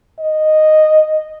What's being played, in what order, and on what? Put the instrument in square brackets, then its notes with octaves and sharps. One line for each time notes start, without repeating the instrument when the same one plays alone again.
[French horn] D#5